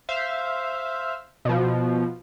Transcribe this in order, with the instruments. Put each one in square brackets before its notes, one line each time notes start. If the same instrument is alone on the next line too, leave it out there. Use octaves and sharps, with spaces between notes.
[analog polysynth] C5 E5 F5
B2 F3